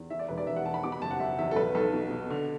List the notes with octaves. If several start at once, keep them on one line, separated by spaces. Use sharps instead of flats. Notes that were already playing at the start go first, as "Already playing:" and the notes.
Already playing: E2
E3 E5
D5
E1 B4
D5
E1 E5
F#5
E2 A5
B5
B2 D6
B5
F#1 A5
F#5
F#1 E5
E2 E5
A4
B1 B4
B1 A4
B2
B2
D3